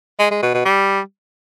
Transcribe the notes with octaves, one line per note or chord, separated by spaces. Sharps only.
G#3
G#3
B2
B2
G3